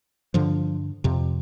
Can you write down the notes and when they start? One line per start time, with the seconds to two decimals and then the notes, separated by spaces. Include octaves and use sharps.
0.34 G2 D3 F3
1.04 F2 C3